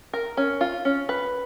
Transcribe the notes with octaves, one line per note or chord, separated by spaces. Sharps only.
A#4
C#4
F4
C#4
B4